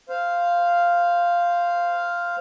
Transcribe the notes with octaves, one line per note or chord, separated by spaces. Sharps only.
C5 F5